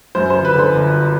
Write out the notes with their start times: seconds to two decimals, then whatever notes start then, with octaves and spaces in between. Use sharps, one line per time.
0.15 F#2 C5
0.30 C5
0.35 G1
0.45 B4
0.55 D3 C5
0.74 G1